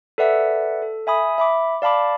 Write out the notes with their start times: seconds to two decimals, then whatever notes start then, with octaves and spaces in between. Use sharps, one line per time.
0.18 A4 B4 D5 E5 F#5
0.82 A4
1.07 E5 G#5 B5 D#6
1.38 E5 B5 D6
1.82 D5 F5 A5 B5 D6